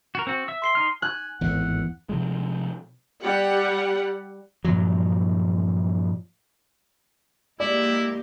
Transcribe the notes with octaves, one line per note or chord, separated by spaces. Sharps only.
F#4 A#4
C4 F#4
E5 E6
C6 C7 G7
D#4 F6
G#5 F#6
G#1 E2 A2 F#5
C3 F3 G#3
G3 G4 F#5
G2 A#2 F3 F#3
G#3 A#3 E4 G4 D5